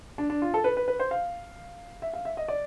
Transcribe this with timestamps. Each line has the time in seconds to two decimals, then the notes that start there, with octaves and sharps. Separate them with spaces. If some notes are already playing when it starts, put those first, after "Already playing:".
0.18 D4
0.30 D4
0.42 F4
0.54 A4
0.64 B4
0.77 B4
0.88 B4
1.00 C5
1.11 F5
2.02 E5
2.13 F5
2.25 E5
2.37 D#5
2.48 D5